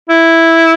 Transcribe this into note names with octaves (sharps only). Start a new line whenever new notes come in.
E4